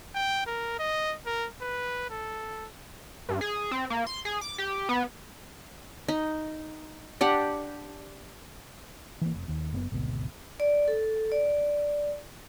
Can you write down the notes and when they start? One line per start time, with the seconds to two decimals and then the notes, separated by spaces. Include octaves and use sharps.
0.15 G5
0.46 A#4
0.79 D#5
1.26 A#4
1.61 B4
2.10 A4
3.29 G2
3.41 G#4
3.71 C4
3.90 A#3
4.07 C6
4.25 G#4
4.41 D6
4.58 G4
4.89 B3
6.08 D#4
7.21 D4 G4 F#5
9.21 E3 A#3
9.34 F1
9.48 D#2
9.72 F#1 A#2 B3
9.92 G#1 D2 B2
10.60 D5
10.88 A4
11.32 D5